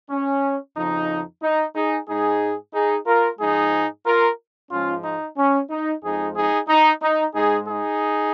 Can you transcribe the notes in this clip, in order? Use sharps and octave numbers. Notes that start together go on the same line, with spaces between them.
C#4
F2 C#3 F3 D#4
D#4
D#4 G#4
G#2 G#3 D#4 G#4
D#4 G#4
F4 A#4
G#2 F3 G#3 D#4 G#4
F4 A#4
G#2 F3 G#3 C#4 F4
D#4
C#4
D#4
F2 F3 G#3 D#4 G#4
D#4 G#4
D#4
D#4
G#2 G#3 D#4 G#4
D#4 G#4